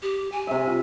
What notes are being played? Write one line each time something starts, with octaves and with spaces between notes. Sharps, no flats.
G4
G#5
C3 E5
F4